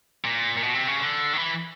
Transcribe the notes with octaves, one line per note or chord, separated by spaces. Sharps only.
A#2
A#2
B2
C3
C#3
D3
D#3
E3